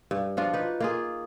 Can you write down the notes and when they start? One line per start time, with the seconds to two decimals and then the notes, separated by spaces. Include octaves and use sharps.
0.11 G2
0.37 F3 D4 F4 F#4
0.53 D#4 B4
0.80 A#3 F4 G#4